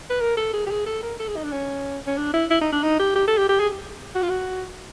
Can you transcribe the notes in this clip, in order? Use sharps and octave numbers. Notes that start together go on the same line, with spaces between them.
B4
A#4
A4
G#4
G4
G#4
A4
A#4
A4
G#4
D#4
D4
C#4
C#4
D4
E4
E4
D#4
D4
D#4
G4
G4
A4
G4
G4
G#4
F#4
F4
F#4